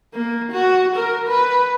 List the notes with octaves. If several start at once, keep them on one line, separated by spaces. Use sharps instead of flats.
A#3
F#4
A#4
B4